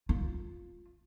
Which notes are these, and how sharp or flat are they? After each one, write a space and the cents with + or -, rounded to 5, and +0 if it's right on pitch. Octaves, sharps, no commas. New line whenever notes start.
F4 +5